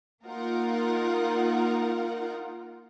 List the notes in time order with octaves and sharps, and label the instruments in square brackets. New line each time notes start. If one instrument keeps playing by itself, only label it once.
[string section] A#3 D#4 F4 A#4 F#5